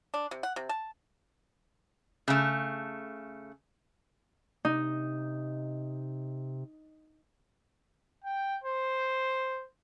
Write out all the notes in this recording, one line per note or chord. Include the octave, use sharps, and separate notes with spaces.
D4
C3
F#5
C3
A5
C#3 A3
C3 D#4
G5
C5